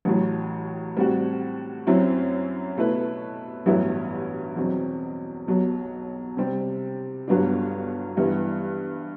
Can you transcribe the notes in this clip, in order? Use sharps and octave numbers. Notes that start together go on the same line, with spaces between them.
A1 A2 F#3
A2 G3 C4 F#4
F#2 F#3 C4 E4
B2 A3 E4 B4
A1 G2 F#3 B3 E4
E2 B2 F#3 C4
B1 B2 F#3
C3 G3 C4
G1 G2 F#3 B3 D4
G2 E3 B3 E4